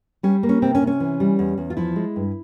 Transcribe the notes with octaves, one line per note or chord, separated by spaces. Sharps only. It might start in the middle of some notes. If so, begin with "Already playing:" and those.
G3 C#4
A#3
C#4
C3 C4
C#4
C3
C#4
E3
G3
E2
E2
F4
F3 E4
G#3
G2